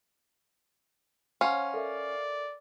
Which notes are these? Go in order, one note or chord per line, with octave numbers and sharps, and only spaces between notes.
C#4 C5 F5 F#5 C6
A4 A#4 D5 E5